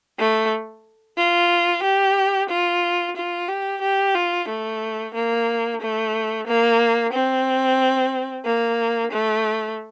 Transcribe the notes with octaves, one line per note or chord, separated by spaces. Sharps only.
A3
F4
G4
F4
F4
G4
G4
F4
A3
A#3
A3
A#3
C4
A#3
A3